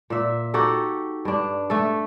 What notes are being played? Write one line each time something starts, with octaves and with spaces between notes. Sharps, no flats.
A#2 E5
D#4 F#4 G4 A4
G2 D4
A3 A4